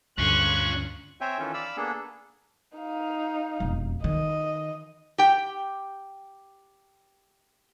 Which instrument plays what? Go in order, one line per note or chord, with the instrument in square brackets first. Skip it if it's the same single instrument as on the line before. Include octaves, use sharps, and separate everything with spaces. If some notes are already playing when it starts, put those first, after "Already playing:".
[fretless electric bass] D2 G2 D3 [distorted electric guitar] C#4 F4 [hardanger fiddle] C#6 [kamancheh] F#6
[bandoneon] C4 C5 C#5 E5 G5 G#5
D#3 E3 C#4 F4 A4
D5 F5 B5 E6
A#3 B3 D4 G#4 A4
[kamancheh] D#4 F5
[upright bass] E1 F2
[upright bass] D#3 [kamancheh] D#5
[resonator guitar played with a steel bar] G4 G5